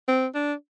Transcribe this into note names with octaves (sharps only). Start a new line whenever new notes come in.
C4
D4